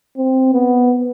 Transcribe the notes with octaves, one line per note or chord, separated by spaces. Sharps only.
C4
B3